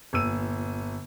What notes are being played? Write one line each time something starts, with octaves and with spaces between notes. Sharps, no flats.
G1 A#2 E6 D#7